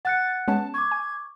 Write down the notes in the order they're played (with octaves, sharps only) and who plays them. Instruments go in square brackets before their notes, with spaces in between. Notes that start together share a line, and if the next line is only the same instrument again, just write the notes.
[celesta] F#5 F#6 C#7 [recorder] A6
[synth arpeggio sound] G#3 B3 C#4 [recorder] A5
[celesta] C#6 D6 [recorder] G#6
[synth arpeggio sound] G#5